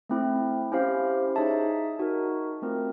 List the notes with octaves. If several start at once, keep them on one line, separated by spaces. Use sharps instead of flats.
A3 C4 E4
C#4 E4 G4 C5 F5
D#4 G#4 C#5 E5 A5
D#4 F#4 A#4
A3 C4 F4 A#4